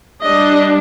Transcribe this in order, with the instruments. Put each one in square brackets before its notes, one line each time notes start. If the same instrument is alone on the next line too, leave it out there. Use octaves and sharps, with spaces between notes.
[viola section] G3 D4 D#5